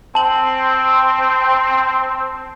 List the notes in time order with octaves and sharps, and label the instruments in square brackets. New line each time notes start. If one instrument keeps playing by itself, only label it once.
[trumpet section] C4 [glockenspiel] A5 F#7